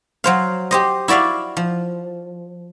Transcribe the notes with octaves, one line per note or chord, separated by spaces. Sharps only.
F#3 C5 F5
G4 C5 D#5
E4 F#4 D5 E5 F5
F3